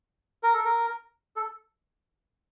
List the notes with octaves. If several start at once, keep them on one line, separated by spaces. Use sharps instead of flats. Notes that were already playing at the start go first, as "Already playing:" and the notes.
A#4
A4
A#4
A4